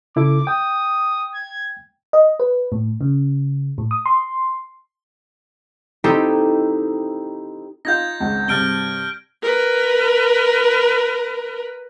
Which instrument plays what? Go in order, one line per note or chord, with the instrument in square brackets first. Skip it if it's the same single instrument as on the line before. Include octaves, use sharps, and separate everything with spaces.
[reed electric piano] C#3 E4 A4 [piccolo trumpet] D6
[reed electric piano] G5 [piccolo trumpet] D#6
[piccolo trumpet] G#6
[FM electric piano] D#5
B4
A2
C#3
A2
D#6
C6
[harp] C4 D#4 E4 G4 A4 G5
[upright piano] D#4 F4 F5 [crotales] G6 G#6 A#6
[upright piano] G#1 C#2
[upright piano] G2 C3 A6 [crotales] F6 D7 G7
[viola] A#4 B4